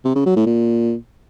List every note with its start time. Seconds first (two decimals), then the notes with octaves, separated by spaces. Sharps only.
0.05 C3
0.15 C#3
0.26 F#3
0.36 A2
0.46 A#2